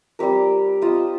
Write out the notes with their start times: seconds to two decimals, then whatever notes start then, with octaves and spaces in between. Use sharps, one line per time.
0.19 G3 C4 G4 A#4
0.81 C4 F4 C5 D#5